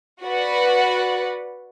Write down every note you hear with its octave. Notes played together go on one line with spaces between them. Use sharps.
F#4 B4 D5 F#5